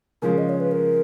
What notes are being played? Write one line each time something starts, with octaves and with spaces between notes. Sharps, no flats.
C#3 F3 G#3 A#4
D#5
C#5
B4
A#4